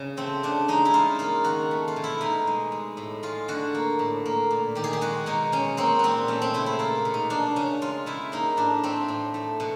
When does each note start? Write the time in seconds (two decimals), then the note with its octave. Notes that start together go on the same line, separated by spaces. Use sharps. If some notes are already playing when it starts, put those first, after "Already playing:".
Already playing: C#3
0.17 A3 C4
0.43 C#3 D4
0.68 G#3 D#4
0.85 E4
0.93 C#3 F4
1.19 A#3 F4
1.44 D#3 F#4
1.71 A3
1.88 F4
1.96 B2
2.04 E4
2.21 B2 D#4
2.47 G#3
2.72 G#3
2.97 A2
3.23 G#3 F4
3.48 D3 F#4
3.75 A#3
3.99 A2
4.26 A#3
4.51 A#2
4.75 D#3 G4
4.84 G#4
4.93 G4
5.01 G#3 F#4
5.26 B2 D#4
5.52 G#3 C#4
5.77 A#3 C4
5.99 A#2 B3 C4
6.28 A3 C#4
6.42 C4
6.54 C#3 E4
6.66 E4
6.79 A#3 F4
7.05 B2
7.14 D#4
7.30 A#3 D4
7.56 C#3 C#4
7.81 G#3 F4
8.06 C#3 E4
8.32 A#3 D#4
8.57 A2 D4
8.83 A3 C4
9.08 A2
9.34 A3
9.60 B2